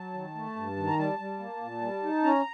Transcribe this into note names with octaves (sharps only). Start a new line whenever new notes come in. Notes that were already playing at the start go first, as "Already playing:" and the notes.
Already playing: F#3 A5
D#3
A3
G2
D#3
A#5
G3 A5
G3
A#3
A#2
G3
D#4
C#4 A#5